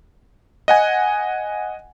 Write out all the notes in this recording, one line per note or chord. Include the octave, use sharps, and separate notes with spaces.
D#5 F#5 G#5